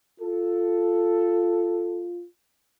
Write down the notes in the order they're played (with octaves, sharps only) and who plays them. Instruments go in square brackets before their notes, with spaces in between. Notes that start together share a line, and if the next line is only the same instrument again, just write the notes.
[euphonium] F4 [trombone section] A4